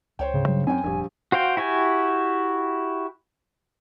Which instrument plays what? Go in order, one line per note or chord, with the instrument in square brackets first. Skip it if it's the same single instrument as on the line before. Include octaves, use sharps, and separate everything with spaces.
[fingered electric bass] C#2 [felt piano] C5 C#5 G5
[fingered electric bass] D2 G#2 [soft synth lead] C#3
[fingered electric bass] G2 F#3
[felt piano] F#2 C#5 G5 [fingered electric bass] C4 [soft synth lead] G#5
[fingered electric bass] F1 [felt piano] A#1 G3
[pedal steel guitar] F#4 C5 F5 G5
E4 F#4 G4 G#5